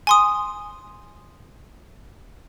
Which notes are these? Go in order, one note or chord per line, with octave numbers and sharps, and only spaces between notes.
G#5 C6 D#6